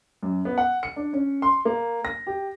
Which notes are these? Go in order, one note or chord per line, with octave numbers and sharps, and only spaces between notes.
F#2
B3
F#5
C#7
D4
C#4
C6
A#3
A#6
G4